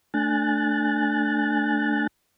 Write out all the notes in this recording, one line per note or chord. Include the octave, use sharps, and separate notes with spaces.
A3 D4 G#5 F#6 A6